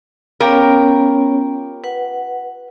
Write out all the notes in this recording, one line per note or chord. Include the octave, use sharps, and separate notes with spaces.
B3 C#4 F4 G4 A#4 C#5 G5
B4 F#5